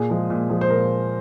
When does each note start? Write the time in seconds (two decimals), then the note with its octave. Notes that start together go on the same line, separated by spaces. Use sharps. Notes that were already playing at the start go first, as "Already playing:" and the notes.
Already playing: A#2 G#4
0.10 F3 G#3
0.30 A#2
0.50 F3 G#3
0.61 C5
0.70 A#2 A#4